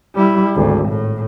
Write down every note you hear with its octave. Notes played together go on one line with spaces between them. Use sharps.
G3 E4
G#1 D2
A2